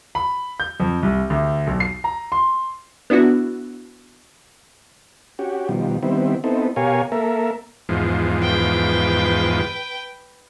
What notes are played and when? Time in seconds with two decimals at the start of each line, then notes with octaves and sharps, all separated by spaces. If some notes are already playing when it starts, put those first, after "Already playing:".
0.15 B5
0.60 G6
0.80 F2
1.03 C2
1.30 D2
1.67 B1
1.80 C7
2.04 A#5
2.32 C6
3.10 B3 D4 E4 F#4
5.39 C#4 F#4 G4
5.69 B2 D#3 F3 G3
6.03 D#3 G3 B3 C4 E4
6.44 B3 C4 D#4 E4 A4
6.76 B2 G4 A#4 C#5 F5 G#5
7.12 A#3 A4 A#4 E5
7.89 E2 G#2 F3
8.43 B4 G5